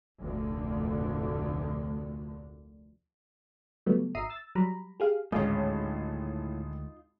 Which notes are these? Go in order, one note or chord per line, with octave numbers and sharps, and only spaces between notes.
F1 D2 A#2 D3
C#3 F#3 G3 A3 B3
G#1 E5 A#5 D#6 C7 D#7
E6 A6
F#3 G3 A#5 B5
G4 G#4 F5
G#1 D2 A2 G#3 C#4 D#4 F4 F5